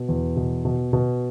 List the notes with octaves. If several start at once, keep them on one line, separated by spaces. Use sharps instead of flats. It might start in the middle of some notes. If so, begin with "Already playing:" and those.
Already playing: B2
E2
B2
B2
B2